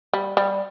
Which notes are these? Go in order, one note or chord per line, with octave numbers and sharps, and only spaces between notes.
G3
G3